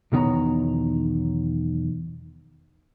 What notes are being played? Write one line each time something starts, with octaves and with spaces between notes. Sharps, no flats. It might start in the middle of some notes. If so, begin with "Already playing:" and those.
B1 E2 D#3 B3 C#5 A#5